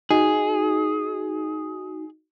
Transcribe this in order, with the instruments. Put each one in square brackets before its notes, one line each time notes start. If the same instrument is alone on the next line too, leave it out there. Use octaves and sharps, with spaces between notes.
[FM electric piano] D#4 F#4 [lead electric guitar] G#4